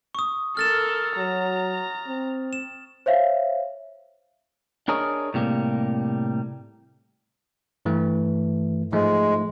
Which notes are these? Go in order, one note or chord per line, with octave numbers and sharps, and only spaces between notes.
C#6 D#6
A4 A#4 F6 A6 E7
F#3 A#5
C4
E7
C5 C#5 E5 F5
D4 G#4 A#4 C#5 D#5
A2 C3 G3 G#3 A#3
G2 E3 A3
G#2 F3 G#3 A3